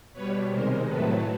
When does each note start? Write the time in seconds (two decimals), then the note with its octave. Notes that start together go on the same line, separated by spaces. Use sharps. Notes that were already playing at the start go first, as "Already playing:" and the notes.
0.13 B2 G3 B4 C#5
0.49 C3 D#3 G#3 A#4 C5
0.86 A2 F#3 A3 A4 B4